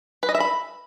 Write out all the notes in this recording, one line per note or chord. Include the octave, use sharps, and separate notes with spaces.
B4
D#5
E5
B5